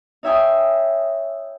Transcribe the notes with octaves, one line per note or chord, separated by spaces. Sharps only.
D#4 C#5 E5 G5 G#5 D#6